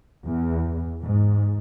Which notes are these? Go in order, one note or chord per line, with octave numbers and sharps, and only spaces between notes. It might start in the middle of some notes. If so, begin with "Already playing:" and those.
E2
G#2